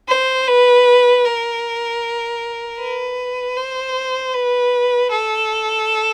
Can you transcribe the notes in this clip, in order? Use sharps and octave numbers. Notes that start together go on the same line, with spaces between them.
C5
B4
A#4
B4
C5
B4
A4